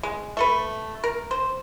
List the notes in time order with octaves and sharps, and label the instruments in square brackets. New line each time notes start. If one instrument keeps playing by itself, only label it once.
[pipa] G#3
A3 A4 B4
A#4
C5